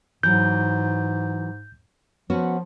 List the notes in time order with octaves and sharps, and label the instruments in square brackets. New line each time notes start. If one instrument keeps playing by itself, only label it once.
[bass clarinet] G#2 [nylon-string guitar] E3 F#3 [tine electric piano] G6
[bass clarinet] F3 [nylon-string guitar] B3 C#4 F#4